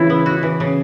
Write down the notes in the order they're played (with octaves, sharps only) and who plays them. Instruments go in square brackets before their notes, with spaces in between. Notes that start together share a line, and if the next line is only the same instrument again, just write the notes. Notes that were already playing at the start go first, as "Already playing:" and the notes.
Already playing: [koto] C#3 E3 [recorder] E4
[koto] B3
F#4
E3
C#3